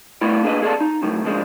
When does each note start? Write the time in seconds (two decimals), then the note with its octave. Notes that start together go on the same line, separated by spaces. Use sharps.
0.21 G3 A3 B3 E4 D5
0.43 A#3 D4 G#4 B4 D#5
0.62 A#3 G#4 A4 C5 D5 A5
0.81 D#4
1.03 F#2 A2 D#3
1.24 D#2 C#3 F3 G#3 B3 D4